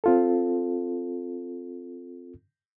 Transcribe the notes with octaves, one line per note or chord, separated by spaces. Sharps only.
C4 F4 A4